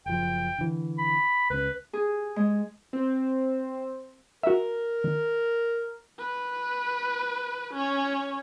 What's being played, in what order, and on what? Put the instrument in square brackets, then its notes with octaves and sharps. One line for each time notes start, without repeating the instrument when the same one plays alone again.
[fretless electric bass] F#1 F3 [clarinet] G5
[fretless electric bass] D3 E3
[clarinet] B5
[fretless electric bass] C#2 C#4 [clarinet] B4
[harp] G#4
G#3
[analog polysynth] C4
[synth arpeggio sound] F#4 E5 [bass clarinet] A#4
[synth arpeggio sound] D#3
[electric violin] B4
C#4 C#5